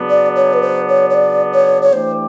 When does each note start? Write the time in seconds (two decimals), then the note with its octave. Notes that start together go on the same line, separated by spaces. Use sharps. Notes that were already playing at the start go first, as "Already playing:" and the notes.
Already playing: C#3 F#3 B3 D4
0.10 D5
0.36 C#5
0.54 B4
0.62 C5
0.89 C#5
1.10 C#5
1.14 D5
1.54 C#5
1.82 C#5
1.93 E3 A3 D4 G4 C5